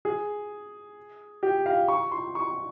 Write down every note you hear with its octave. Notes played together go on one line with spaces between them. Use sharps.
G#4
G4
F5
C#6
C6
C#6